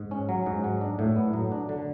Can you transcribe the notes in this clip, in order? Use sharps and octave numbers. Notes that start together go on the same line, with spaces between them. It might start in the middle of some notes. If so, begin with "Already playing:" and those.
Already playing: G#2
C#4
F#3
G#2
F#3
D4
A2
B3
F#3
D4
D3